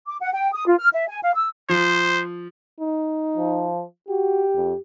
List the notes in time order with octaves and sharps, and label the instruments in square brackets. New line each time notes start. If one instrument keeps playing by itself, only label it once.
[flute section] D6
F#5
G5
D#6
F4
F6
E5
G#5
F5
E6
[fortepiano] F3 [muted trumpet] C5
[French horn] D#4
[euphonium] F3
[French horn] F#4 [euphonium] G4
[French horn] F2